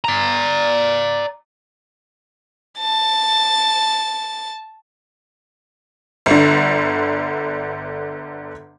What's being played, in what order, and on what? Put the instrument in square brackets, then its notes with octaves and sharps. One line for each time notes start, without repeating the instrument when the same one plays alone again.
[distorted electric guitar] D5 A#5
[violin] A5 A6
[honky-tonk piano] G1 D3